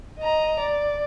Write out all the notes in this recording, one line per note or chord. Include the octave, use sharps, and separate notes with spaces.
D#5 A#5
D5